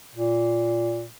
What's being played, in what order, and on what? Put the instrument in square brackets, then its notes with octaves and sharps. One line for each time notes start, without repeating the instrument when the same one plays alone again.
[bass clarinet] A#2